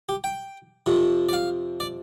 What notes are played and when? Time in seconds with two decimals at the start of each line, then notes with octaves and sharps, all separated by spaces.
0.09 G4
0.24 G5
0.86 F2 C3 F3
1.29 D5
1.33 F5
1.80 D5